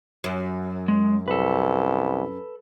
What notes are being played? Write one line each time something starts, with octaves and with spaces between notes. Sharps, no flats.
F#2
G#3
C2 A4 B4